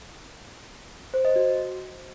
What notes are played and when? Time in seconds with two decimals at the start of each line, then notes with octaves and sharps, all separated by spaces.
1.14 C5
1.25 D#5
1.36 F#4